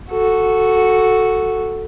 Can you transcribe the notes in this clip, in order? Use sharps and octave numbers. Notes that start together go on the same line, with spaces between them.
F#4 A4